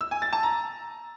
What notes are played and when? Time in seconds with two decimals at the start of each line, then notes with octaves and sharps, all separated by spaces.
0.01 E6
0.11 G#5
0.22 A6
0.33 A5
0.43 A#5